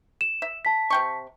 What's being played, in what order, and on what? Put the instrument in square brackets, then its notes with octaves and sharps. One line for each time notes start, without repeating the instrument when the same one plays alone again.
[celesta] E7
[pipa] E5
[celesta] A5 B6
[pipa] C3 G5 C#6